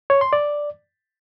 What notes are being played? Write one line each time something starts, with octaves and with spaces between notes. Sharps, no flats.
C#5
C6
D5